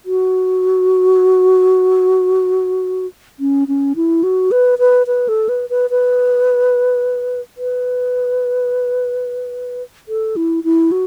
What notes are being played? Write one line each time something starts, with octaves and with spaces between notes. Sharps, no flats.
F#4
C#4
C#4
E4
F#4
B4
B4
B4
A4
B4
B4
B4
B4
A4
E4
E4
F#4